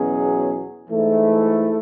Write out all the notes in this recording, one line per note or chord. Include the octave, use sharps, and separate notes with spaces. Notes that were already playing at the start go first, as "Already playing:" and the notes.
Already playing: E2 B2 F#3 C#4 G#4
G#2 E3 A3 E4